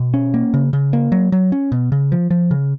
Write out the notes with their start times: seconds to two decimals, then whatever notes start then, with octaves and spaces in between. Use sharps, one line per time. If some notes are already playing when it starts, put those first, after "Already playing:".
Already playing: B2
0.14 C#4
0.34 A#3
0.54 C#3
0.73 C#3
0.93 A#3
1.12 F#3
1.32 F#3
1.52 C#4
1.72 B2
1.92 C#3
2.12 F3
2.30 F3
2.51 C#3